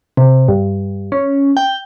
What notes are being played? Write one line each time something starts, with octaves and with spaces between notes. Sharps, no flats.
C3
G2
C#4
G5